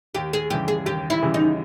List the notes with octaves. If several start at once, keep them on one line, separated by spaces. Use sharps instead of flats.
D#2 G4
G#4
C#3 E3 G3 G4
G#4
D#2 G4
E4
C#3 E3 G3
D#4